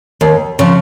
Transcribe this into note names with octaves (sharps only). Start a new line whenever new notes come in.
D#2
C#3 F3